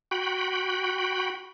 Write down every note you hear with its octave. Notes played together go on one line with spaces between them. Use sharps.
F#4 G5 B5